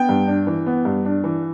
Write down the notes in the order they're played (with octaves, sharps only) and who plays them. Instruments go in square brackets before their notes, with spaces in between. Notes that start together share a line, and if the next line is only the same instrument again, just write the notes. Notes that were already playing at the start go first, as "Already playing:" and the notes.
Already playing: [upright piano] B3 G5
G2
D4
E3
B3
G2
D4
E3